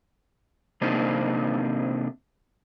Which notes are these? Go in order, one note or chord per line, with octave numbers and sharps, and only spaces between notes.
C3 A#3 C4 D4 D#4